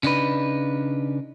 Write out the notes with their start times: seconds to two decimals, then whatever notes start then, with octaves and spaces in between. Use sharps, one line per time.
0.03 C#3 D4 D#4 B4